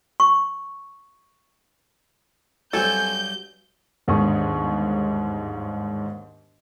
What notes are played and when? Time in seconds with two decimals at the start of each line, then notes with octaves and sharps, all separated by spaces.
0.20 C#6
2.73 G2 F#3 C4 A4 G#5 G6
4.08 G1 D#2 G#2 D4 C#6 D#6